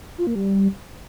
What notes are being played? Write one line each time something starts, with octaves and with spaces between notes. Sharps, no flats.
F4
A#3
G3